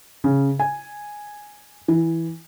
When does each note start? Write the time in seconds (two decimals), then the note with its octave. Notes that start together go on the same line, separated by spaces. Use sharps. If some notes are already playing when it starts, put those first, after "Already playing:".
0.24 C#3
0.60 G#5
1.88 E3